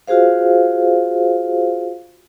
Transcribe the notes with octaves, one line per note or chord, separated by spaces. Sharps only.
F4 F#4 G#4 C5 F5